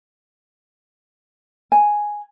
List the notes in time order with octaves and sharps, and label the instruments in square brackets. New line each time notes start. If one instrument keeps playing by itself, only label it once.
[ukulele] G#5